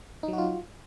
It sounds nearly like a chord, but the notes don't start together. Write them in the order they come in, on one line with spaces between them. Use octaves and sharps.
D#4 F#3 F#4 F4